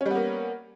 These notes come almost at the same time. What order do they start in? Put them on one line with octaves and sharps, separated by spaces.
C#4 G3 B3 A#3